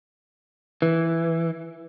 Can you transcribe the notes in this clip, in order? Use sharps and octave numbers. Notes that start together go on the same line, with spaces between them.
E3